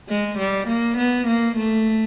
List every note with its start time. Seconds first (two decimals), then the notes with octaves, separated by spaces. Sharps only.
0.09 G#3
0.38 G3
0.68 A#3
0.97 B3
1.27 A#3
1.57 A3